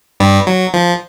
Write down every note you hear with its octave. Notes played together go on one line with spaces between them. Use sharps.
G2 G3
F#3
F3